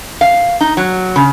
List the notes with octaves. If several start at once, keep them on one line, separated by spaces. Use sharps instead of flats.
F5
D#4
F#3
C#3